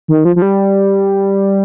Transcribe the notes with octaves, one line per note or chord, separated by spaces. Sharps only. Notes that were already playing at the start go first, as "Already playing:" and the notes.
D#3
F3
F3
G3